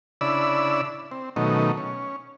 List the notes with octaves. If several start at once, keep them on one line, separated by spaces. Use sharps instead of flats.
C#3 D4 E4 D5 B5 E6
C4
B2 D#3 F#3 A3 C#4 D#4
C#4